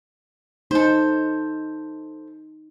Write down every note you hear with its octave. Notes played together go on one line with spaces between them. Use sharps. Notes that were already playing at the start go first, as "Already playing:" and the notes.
D#4 A4 C5